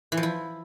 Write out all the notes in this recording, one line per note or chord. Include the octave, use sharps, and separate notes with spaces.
E3
F3
E4